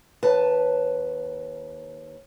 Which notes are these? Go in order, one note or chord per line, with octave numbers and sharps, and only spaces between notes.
D#2 B4 A5